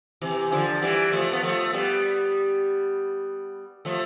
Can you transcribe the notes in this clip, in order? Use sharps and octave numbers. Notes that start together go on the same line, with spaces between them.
C3 E3
D3 F3
E3 G3
F3 A3
B3
F3 A3
G3 B3
F3 A3